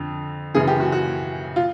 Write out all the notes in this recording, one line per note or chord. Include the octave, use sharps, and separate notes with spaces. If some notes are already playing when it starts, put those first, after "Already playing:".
Already playing: F2 D3
F#2 C#3 E3 G#4
G4
F#4
F#4
F4